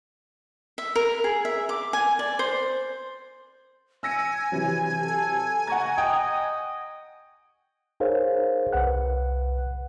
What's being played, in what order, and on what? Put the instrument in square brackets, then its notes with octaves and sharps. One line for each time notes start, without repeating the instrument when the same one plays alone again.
[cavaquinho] E5
A#4
G#4
E5
D6
G#5
D5
C5
[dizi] G#5 [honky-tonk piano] E6 A#6 C#7
[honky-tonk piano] C3 E3 F#3
[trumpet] A4
[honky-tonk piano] F#5 C#6 G#6 [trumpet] A#5
[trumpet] D#5 [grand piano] G5
[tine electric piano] D#4 G#4 A#4 C5 C#5 F5
C2 B4 F#5 F#6